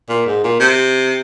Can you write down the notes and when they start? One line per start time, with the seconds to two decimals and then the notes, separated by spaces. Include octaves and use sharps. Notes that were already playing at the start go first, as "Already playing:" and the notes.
0.09 A#2
0.26 G#2
0.44 A#2
0.60 C3